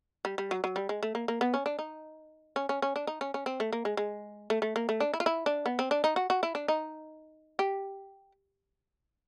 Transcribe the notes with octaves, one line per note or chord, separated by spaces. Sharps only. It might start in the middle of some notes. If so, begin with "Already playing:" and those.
G3
G3
F#3
F#3
G3
G#3
A3
A#3
A#3
B3
C#4
D4
D#4
C#4
C#4
C#4
D4
D#4
C#4
C#4
C4
A3
A#3
G#3
G#3
A3
A3
A#3
A3
D4
E4
F4
E4
D4
B3
C4
D4
D#4
F#4
F#4
E4
D4
D#4
G4